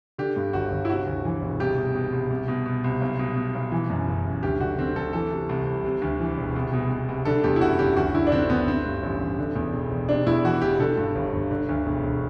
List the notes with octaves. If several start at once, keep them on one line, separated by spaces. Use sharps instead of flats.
D3 G4
G2
G1 F#4
G1
E4
C3 F#4
D2
E3
E1
C2 G4
B2
B2
C2
C2
B2
B2
C2
B1
B2
B2
B1
E3
F#2
F#1
F#1
D2 G4
D3 F#4
D3 C4
D2 A4
E3 A4
C3
C2
C2
C3
D2
E3
E1
C2
B2
B2
C2
D3 A4
E2 G4
E4
F#1 F#4
F#1 G4
D2 F#4
D3 E4
D4
D3 C4
D2 B3
D3 C4
G2
A1
A1
D3
E2
E1
E1
C3 D4
E2 E4
E3 F#4
E1 G4
D3 A4
G2
G1
G1
D3
D2
E1
E1